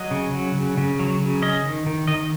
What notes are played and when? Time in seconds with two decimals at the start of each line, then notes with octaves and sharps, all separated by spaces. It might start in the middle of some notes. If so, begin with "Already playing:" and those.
Already playing: F#3 D#5
0.11 C#3
0.33 F#3
0.55 C#3
0.78 C#3
0.99 F#3
1.21 C#3
1.42 C#4 D#5
1.65 D#3
1.87 D#3
2.07 D#3 D#5